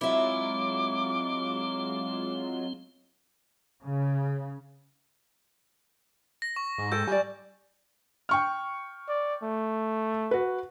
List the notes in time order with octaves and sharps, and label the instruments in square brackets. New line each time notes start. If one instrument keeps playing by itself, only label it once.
[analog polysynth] F#3 G#3 F4 [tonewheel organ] C4 [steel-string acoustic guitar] E4 E5 [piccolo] D6
[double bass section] C#3
[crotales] A#6
C#6
[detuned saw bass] G#2
[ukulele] A4 G5 [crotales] G6
[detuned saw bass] G3 [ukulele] D5 G#5
[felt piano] G5 C#6 F6
[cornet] D5
A3
[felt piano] F#4 B4